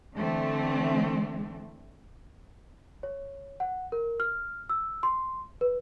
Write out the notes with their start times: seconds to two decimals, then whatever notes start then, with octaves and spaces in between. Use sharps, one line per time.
0.15 D3 E3 A3 C4
3.03 C#5
3.60 F#5
3.92 A#4
4.20 F6
4.69 E6
5.03 C6
5.61 B4